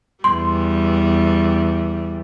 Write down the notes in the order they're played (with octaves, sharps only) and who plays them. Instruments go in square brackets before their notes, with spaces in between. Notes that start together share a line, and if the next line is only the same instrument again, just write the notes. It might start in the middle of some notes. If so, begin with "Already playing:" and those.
[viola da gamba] E2 G3 [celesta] C6